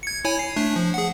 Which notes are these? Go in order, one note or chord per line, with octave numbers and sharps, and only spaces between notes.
G#6 C#7
E4 C#5 G#5
C7
A3 D4
F3
G#4 F#5